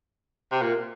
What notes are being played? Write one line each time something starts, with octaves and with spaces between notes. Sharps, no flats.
C3
A#2